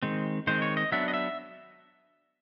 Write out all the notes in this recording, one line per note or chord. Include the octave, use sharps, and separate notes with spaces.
D#3 G#3 C4
D#3 G#3 C4 C5
C#5
D#5
F#3 B3 D4 E5
D#5
E5